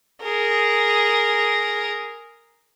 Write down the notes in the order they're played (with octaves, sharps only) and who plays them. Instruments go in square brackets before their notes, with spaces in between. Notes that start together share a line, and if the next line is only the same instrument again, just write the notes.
[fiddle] G#4 A#4